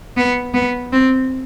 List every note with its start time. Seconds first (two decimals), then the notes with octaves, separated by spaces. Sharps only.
0.17 B3
0.54 B3
0.92 C4